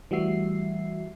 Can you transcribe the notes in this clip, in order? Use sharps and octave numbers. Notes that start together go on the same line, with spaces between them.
E3 G3 A3 F#4 E5 C7